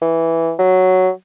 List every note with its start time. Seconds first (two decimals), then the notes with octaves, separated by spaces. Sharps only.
0.02 E3
0.59 F#3